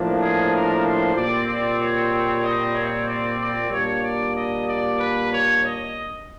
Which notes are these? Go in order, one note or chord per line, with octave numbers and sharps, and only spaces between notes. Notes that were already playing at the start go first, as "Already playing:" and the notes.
Already playing: A2 F3 A#3 D4
G#4
A#4
C5
A#2 G3 C4 D5
D5
C#5
D#5
C#5
D5
D5
A#2 G3 A#3 D4 C#5
D5
D#5
D5
B4
C#5
D#5